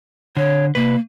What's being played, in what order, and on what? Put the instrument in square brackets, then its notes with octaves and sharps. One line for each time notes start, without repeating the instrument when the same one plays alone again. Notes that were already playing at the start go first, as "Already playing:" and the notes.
[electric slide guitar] D3 [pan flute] C#5
[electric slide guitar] C3 B4 [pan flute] A#3